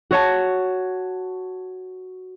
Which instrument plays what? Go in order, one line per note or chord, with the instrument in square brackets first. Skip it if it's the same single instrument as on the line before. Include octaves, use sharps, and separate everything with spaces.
[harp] F#4 C#5 A5